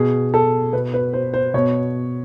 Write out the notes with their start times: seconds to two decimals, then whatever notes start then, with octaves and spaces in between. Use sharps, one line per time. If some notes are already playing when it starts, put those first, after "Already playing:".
Already playing: B2 G#4
0.34 A4
0.73 B2 B4
0.94 B4
1.13 C5
1.34 C5
1.54 B2 C#5